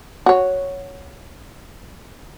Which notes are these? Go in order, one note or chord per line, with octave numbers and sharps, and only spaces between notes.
F#4 C#5